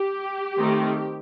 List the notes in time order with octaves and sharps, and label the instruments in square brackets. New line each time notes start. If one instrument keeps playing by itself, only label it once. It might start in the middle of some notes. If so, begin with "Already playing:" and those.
Already playing: [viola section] G4
D#3 A3 C4 D#4